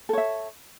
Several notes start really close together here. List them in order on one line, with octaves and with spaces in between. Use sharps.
A4 C#5 E5